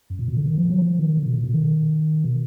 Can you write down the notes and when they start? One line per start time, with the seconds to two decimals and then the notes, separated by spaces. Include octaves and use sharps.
0.10 F#2
0.19 A#2
0.28 B2
0.37 D3
0.46 D#3
0.58 F3
0.70 F#3
0.82 F3
0.99 D#3
1.17 D3
1.26 B2
1.35 A#2
1.44 B2
1.53 D#3
2.24 B2